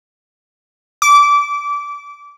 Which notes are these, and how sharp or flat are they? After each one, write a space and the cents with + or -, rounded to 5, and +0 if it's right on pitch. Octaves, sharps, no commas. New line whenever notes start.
D6 -20